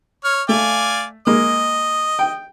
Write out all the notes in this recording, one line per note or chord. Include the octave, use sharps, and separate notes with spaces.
C#5 F6
A3 D5 F5 G#5
G#3 A#3 D#5
G5